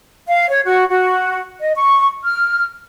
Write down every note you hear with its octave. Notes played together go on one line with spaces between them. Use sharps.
F5
C#5
F#4
F#4
D#5
C#6
F6